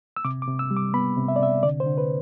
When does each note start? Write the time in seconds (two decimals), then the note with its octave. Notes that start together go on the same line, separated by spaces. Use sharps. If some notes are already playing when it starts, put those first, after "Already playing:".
0.17 E6
0.25 C3 D6
0.42 D6
0.48 C3
0.59 E6
0.71 G3
0.77 D6
0.94 B3 B5
1.17 C3
1.28 E5
1.36 D5
1.40 C3 E5
1.63 D3 D5
1.80 C5
1.86 D3
1.98 B4